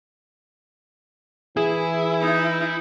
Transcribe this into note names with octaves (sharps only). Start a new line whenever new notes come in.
E3 E4 G#4
D#4